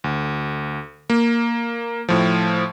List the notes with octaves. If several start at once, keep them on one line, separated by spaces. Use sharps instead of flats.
D2
A#3
A2 F3